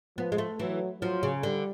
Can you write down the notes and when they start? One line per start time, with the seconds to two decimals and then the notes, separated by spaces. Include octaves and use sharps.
0.17 F3 B3
0.32 G#3
0.38 A3
0.59 E3 F#3
1.01 F3 F#3
1.23 C#3
1.43 D3 G3